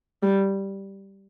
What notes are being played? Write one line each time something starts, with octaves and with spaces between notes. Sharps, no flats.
G3